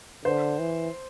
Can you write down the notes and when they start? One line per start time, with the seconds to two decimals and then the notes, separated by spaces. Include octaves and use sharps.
0.25 D3 C5
0.59 E3